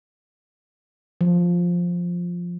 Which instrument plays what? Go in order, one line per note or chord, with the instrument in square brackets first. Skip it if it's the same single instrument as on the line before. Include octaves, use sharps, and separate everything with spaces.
[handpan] F3